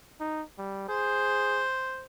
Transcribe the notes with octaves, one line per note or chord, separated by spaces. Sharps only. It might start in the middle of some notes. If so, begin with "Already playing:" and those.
D#4
G3
G#4 C5